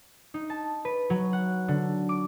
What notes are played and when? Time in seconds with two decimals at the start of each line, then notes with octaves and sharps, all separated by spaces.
0.34 D#4
0.50 A5
0.85 B4
1.10 F#3
1.33 F#5
1.68 D3
2.09 D6